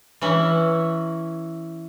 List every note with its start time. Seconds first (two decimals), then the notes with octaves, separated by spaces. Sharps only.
0.21 E3 C#4 E4 F#4